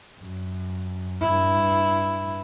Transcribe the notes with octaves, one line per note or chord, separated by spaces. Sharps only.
F#2
G2 E4